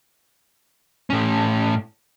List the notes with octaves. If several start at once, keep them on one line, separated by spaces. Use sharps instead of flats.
A2 C#4